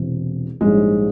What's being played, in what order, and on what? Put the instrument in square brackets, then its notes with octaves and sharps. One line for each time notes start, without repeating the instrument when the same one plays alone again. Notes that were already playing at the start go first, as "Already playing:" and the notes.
Already playing: [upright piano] E1 E2 C3
[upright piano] A#1 G#2 G3 C#4 E4 [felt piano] G#3